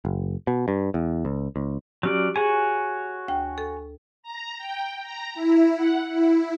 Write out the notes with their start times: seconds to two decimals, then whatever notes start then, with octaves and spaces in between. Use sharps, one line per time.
0.05 F#1
0.47 B2
0.68 G2
0.94 E2
1.25 C#2
1.56 C#2
2.03 F#3 C#4 G4 D5
2.36 F#4 G#4 C#5 G#5
3.28 D2 G5
3.58 A4
4.23 A#5
4.58 G5
5.01 A#5
5.35 E4
5.76 F#5
6.10 E4